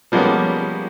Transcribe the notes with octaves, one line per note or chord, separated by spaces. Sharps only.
F3 G3 G#3 A#3 B3 C#4